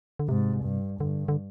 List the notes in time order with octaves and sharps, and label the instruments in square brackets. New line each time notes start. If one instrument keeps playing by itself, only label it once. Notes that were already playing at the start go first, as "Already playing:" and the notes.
[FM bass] D3
[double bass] G#2 [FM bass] C3
[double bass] G2
[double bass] G2 [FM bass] D3
[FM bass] D3